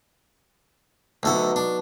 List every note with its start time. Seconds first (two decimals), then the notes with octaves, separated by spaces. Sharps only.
1.23 D2 F#3 B3 D#4 A4 F#5
1.56 D4